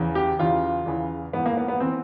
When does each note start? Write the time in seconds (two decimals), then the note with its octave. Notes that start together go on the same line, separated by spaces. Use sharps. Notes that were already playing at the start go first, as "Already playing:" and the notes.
Already playing: E2 C#3 E3
0.15 G4
0.39 E2 C#3 E3 F4
0.86 E2 C#3 E3
1.33 G#2 E3 B3
1.46 A#3
1.57 B3
1.68 B3
1.80 E3 C4